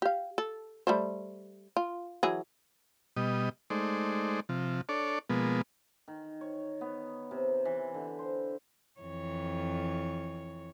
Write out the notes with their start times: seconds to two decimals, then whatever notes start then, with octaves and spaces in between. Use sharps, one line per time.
0.02 G4 F5
0.38 A4
0.87 G3 A3 C5
1.77 F4
2.23 E3 F#3 G#4
3.17 B2 G3 D#5
3.70 G#3 A3 D#4 C5 D5
4.49 C3 F3
4.89 D4 A4 C#5 D5
5.30 B2 F3 G#3 A#3 B3
6.08 D#3
6.41 C#5
6.81 B3
7.31 C3
7.65 E3
7.94 D3
8.19 C5
9.01 F2 E3 C#5